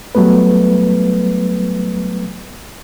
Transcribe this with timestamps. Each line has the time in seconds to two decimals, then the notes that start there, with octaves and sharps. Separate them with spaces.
0.15 F#3 G3 A3 B3 B4